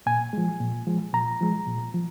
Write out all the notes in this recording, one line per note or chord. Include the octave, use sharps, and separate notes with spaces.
A#2 G#5
F3 G#3
A#2
F3 G#3
A#2 A#5
F3 G#3
A#2
F3